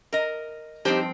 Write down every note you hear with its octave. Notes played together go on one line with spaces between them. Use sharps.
A#4 D#5
G2 F3 C4 D#4 G4 C5